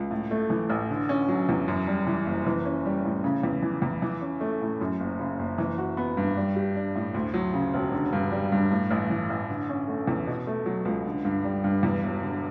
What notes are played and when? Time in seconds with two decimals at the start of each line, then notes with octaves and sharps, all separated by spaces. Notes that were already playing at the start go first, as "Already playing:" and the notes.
Already playing: C#2
0.11 A2
0.31 A3
0.50 E3
0.70 A1
0.90 D3
1.09 C#4
1.29 F#3
1.49 E2
1.68 F#2
1.88 G3
2.07 E3
2.26 F#1
2.46 E3
2.65 C#4
2.86 G3
3.05 A2
3.24 C#3
3.43 E2
3.62 E3
3.82 E2
4.02 E3
4.21 C#4
4.41 A3
4.61 A2
4.81 F#2
5.00 F#1
5.19 C#3
5.39 F#1
5.58 E3
5.78 F#4
5.97 B3
6.17 G2
6.37 G3
6.56 G4
6.75 D4
6.96 A2
7.14 D2
7.34 F#3
7.54 C#3
7.74 E1
7.92 D3
8.13 G2
8.32 G3
8.52 G2
8.71 A2
8.91 A1
9.10 E3
9.30 A1
9.50 D3
9.69 C#4
9.88 A3
10.08 E2
10.27 B2
10.47 A3
10.66 F#3
10.85 C#2
11.06 D3
11.25 G2
11.44 G3
11.64 G2
11.83 E2
12.03 E1
12.23 D3